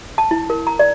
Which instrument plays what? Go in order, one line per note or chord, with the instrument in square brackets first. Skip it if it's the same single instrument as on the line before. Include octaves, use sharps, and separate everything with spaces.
[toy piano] A5
E4
A#4
A#5
D5